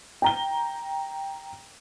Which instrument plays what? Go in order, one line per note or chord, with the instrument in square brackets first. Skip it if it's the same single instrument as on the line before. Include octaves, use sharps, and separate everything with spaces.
[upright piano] G5 A#5 G7